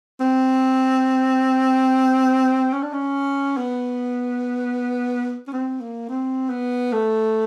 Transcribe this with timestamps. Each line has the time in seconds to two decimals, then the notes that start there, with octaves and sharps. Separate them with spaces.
0.20 C4
2.73 C#4
2.83 D4
2.93 C#4
3.57 B3
5.47 C#4
5.53 C4
5.80 A#3
6.09 C4
6.50 B3
6.92 A3